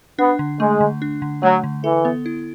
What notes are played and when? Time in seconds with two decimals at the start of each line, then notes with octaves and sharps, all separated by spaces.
0.18 B3 D4
0.39 D3
0.60 G#3 A3
0.81 D3
1.02 D4
1.22 D3
1.42 F#3 A3
1.64 D3
1.84 E3 A4
2.05 B3
2.26 E4